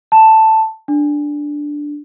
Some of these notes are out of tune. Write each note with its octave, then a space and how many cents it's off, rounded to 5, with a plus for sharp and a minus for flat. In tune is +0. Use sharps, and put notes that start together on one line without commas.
A5 +5
D4 +0